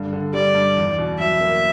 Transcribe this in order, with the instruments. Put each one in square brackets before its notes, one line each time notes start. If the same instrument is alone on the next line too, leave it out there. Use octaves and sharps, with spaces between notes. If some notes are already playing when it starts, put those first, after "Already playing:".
Already playing: [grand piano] G2 D3
D3
[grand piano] G3 [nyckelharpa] D5
[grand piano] G2
E2
B2
[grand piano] F#3 [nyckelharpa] E5
[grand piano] A#3